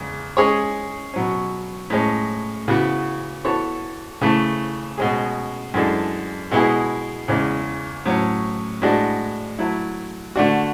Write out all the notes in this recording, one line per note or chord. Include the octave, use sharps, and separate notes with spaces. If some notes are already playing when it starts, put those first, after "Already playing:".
Already playing: E2 C#3 G#3
G#3 C#4 G#4 C#5
B2 F#3 C#4
A2 G#3 C#4
C#3 E3 B3 F#4 B4
E3 B3 F#4 A4 C#5
C#3 E3 A3
B2 G#3 C#4 G#4
F#2 E3 G#3 D4 A4
B2 G#3 B3 E4 G#4
E2 C#3 E3 G#3 C#4
A2 F#3 C#4
A2 G#3 D4 F#4
F#3 A3 E4
D3 A3 D4 F#4